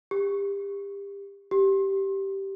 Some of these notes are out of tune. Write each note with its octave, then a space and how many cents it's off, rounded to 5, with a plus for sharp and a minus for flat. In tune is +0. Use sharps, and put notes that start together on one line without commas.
G4 +30
G4 -10